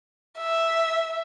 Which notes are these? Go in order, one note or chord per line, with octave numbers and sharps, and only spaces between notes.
E5